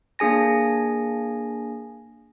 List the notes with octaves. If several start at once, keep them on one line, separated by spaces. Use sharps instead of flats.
A#3 D4 G#4 G#5 A#6